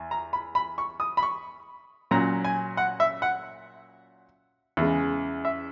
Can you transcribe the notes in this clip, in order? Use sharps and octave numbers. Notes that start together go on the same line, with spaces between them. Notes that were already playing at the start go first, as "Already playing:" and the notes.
Already playing: E2
A#5
B5
B5
C#6
D#6
B5
C#6
A#2 F#3 C#4 A#5
G#5
F#5
E5
F#5
E2 C#3 G#3
E5